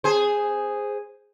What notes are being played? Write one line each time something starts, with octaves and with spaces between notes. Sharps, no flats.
G#4 C5